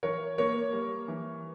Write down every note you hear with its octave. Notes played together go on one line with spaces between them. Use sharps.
E3 A#4 C#5
A#3 A#4 C#5
G3
E3